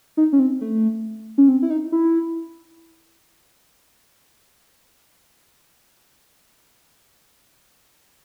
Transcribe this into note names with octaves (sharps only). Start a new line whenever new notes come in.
D#4
C#4
C4
A3
C#4
C4
E4
D#4
E4